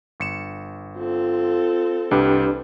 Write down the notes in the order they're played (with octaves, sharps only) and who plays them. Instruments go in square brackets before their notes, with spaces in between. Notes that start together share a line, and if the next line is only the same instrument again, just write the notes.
[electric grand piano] G1 C#7 E7
[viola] C4 A4 [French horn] F4
[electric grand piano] C2 G3 [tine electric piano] D4 G4 B4